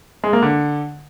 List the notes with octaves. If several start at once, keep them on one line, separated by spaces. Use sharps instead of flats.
G#3
A#3
D3